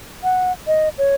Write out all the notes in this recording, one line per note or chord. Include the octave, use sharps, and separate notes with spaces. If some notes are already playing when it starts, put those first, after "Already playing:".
F#5
D#5
C#5